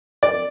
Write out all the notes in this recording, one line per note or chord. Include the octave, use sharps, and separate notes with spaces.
D5